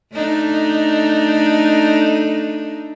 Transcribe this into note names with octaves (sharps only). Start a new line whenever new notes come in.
A3 D4 D#4